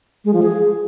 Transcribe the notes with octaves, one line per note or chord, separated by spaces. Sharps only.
G#3
F3
G#4